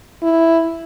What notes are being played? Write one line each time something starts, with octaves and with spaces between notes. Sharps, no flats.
E4